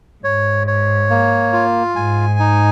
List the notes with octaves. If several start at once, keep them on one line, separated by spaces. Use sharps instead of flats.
G#2 C#5
C#5
A#3
F4
G#2 G#5
D#4